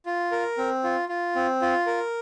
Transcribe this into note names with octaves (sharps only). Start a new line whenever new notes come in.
F4
A#4
C4
F4
F4
C4
F4
A#4